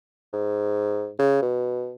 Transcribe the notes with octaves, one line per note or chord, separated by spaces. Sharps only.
G#2
C#3
B2